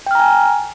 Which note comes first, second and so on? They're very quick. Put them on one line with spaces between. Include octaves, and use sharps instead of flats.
G5 F6 A#5 G#5